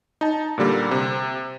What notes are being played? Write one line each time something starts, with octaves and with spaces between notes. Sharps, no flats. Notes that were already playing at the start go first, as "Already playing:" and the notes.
D#4 A5
A#2 D3 G3 A#3
C3